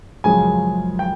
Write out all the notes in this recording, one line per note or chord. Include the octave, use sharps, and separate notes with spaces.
F#2 C#3 F3 G#3 G#5
G5